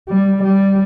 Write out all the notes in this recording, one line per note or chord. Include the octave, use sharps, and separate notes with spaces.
G3
G3